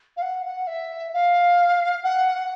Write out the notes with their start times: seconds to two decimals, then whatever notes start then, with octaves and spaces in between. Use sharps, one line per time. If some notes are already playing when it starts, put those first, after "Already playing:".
0.17 F5
0.22 F#5
0.46 F#5
0.67 E5
1.13 F5
2.03 F#5